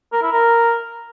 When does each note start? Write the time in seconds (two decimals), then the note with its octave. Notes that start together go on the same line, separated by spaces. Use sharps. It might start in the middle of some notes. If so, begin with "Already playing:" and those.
0.13 A#4
0.22 E4
0.32 A#4